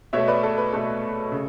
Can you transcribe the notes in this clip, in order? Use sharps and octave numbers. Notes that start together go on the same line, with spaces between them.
B2 A3 C#5 E5
B4 D5
A4
B4
B2 A3 A4
C#3